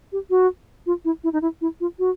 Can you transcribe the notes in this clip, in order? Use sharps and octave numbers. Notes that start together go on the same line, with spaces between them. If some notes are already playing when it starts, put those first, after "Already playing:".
G4
F#4
F4
E4
E4
D#4
E4
E4
F4
F#4